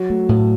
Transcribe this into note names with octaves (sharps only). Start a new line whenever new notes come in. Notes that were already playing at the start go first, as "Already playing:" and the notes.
Already playing: F#3
A3
A2